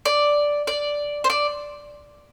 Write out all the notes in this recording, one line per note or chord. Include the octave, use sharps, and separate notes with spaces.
D5
D5
C5
D5